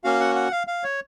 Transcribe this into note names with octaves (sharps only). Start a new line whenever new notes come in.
A#3 C#4 F#4 F5
F#5
F#5
F5
F5
C#5